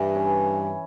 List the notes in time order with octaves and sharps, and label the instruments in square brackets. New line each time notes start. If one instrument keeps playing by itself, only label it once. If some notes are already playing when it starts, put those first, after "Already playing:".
Already playing: [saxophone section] G2 [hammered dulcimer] E3
[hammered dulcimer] C#4